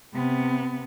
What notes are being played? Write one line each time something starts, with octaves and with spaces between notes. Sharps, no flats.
C3 B3